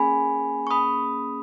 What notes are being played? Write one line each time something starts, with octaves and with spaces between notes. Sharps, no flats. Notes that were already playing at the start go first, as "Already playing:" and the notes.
Already playing: A#3 C#4 G#4 G#5 B5
C#6
B5 D#6